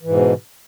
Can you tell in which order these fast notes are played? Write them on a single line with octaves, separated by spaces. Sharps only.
E3 G#2 B2